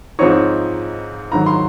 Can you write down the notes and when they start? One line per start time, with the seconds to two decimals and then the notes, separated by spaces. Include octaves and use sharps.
0.19 G#2 F3 C4 D#4 C#5 C#6
1.32 G#2 D#3 F#3 A#5
1.46 C6